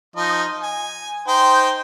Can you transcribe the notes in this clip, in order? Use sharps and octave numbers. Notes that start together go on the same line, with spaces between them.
F3 D#4 D#5
G#5
D#4 C5 G5